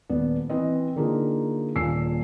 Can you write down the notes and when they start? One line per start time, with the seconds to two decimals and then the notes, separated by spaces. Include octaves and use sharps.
0.09 D#1 B3 D5
0.50 E3 C4 B4 D#5
0.96 D3 A#3 D#4 F4 G#4
1.75 D#1 A#2 C#3 G#5 E6 C7